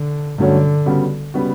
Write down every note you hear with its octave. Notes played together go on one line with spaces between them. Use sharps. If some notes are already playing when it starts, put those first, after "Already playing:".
Already playing: D3
G2 D3 F#3 A3 C#4 F#4
C#3 G3 B3 F#4
C#3 G3 B3 F#4